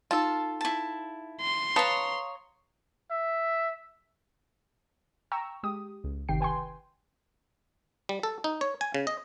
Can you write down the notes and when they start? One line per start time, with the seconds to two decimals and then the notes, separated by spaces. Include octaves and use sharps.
0.11 D#4 F4 A4 A5
0.61 E4 A5
1.41 C6
1.76 B4 C#5 F5 A5 A#5 D#6 E7
3.11 E5
5.32 G5 A#5 C#6 E6
5.63 G#3 G4 D#6
6.04 C#2
6.29 G1 C3 D#3 G4 G5 C7
6.40 B4 G5 G#5 C6
8.09 G3
8.23 A4
8.44 D#4
8.61 C#5
8.81 G#5
8.94 C#3
9.07 D#5